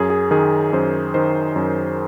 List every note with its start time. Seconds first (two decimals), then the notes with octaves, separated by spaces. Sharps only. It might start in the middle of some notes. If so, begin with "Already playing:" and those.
Already playing: F#2 G#4
0.10 G#4
0.31 D#3 G#4
0.73 F#2 C5
1.14 D#3 C5
1.56 F#2